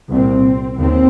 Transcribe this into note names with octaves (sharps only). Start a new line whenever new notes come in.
C2 A#2 C4
D#2 C4